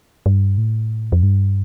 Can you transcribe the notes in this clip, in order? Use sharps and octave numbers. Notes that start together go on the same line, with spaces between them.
G2
A2
F2
G2